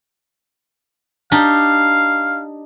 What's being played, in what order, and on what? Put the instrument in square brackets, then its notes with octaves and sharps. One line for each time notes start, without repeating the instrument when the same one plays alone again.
[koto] D4 D#4 G4 [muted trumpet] F5